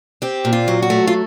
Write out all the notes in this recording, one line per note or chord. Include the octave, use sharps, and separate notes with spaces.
C4 G4
A#2
F4
F#3
F#4
A3
F4